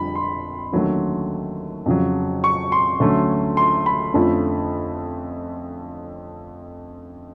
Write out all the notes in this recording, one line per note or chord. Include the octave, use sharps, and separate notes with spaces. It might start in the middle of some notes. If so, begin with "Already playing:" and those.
Already playing: F2 D3 G3 B5
C6
D#2 D3 F#3 A3 C#4
F2 C#3 F#3
C#6
C6
D2 D3 F#3 A3 C#4
C6
B5
F2 D3 F3 A3 C#4